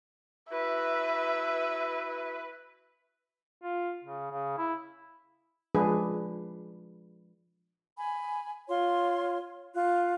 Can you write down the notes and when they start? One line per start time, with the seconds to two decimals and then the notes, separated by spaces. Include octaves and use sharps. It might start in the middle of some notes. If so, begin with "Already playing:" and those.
0.51 E4 F#4 B4 E5
3.62 F4
4.04 C#3
4.31 C#3
4.58 E4
5.75 F3 G#3 D4 G#4 B4
7.97 G#5 B5
8.67 F4 C#5 C6
9.73 F4 F#6